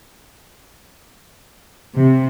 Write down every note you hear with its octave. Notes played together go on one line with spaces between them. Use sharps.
C3